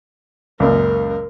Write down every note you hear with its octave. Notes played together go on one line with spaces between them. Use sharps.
C#2 F#2 A#2 A#4